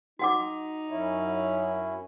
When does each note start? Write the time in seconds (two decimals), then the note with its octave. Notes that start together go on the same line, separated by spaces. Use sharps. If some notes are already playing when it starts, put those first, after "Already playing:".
0.19 D#4 F#4 F#5 D6
0.88 F#2 C#4 E4